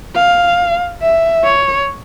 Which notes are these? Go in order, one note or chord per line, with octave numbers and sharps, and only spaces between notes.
F5
E5
C#5